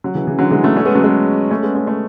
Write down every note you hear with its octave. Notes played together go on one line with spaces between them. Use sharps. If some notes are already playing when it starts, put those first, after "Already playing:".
F#3
C#3 E3
C#3 E3
D3 F#3
E3 G#3
F#3 A3
A3 C#4
G#3 B3
F#3 A3
G#3 B3
A3 C#4
G#3 B3
A3 C#4
A3 C#4